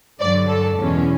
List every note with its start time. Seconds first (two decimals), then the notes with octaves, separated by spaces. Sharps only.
0.20 G2 D3 F#3 D5
0.48 A4
0.76 E2 B2 G#3 C#4